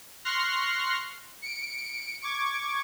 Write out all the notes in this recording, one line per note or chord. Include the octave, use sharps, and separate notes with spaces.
C6 C#6 F6 F#6 A#6 C7
C#7 D7
C#6 D6 G#6